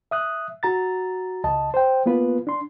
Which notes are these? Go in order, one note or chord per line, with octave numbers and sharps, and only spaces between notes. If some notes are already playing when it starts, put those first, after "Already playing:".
E5 D#6 F#6
F#4 A#5 A6
C#2 D#5 A5
C5 G5
A#3 B3 F4 B4
D4 C6